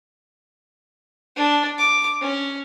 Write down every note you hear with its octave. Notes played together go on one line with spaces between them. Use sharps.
D4
D6
C#4